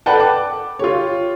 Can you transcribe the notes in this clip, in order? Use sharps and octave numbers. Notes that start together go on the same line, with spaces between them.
A4 B4 D5 F#5 G5 A5
D6
F4 G4 C#5